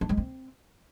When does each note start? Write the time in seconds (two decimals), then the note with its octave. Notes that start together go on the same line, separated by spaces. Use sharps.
0.01 D4
0.09 G#3
0.17 C4